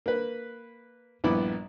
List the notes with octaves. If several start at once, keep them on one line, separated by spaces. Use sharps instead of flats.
A#3 B4
A#1 G2 B3 E4 B5 D6